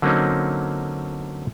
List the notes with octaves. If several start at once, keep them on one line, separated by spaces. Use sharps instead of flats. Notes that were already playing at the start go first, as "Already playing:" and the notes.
D3 F#3 A#3 C4 C#4 D#4